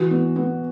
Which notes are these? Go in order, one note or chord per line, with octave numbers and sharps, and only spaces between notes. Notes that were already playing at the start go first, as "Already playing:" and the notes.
Already playing: E3 F#4
B3
B3